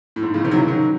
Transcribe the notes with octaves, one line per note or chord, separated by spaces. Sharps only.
A2
G#2
A2 C#3
C3 D#3
F#3
C#3 E3
D#3 F#3